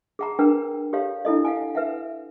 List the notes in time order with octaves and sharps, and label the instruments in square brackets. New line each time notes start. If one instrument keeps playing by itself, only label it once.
[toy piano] G#4 F#5 A#5
D4 A#4 B4 F#5 G5
G4 A4 C#5 F5
D4 E4 A4 D#5
F5 F#5 G#5
B4 E5 F#5